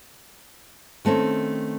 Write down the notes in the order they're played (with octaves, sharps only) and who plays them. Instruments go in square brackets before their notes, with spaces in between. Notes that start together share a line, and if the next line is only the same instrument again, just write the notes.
[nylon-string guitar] D#3 A3 C4 C#4